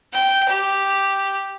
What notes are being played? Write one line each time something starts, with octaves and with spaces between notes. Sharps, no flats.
G5
G4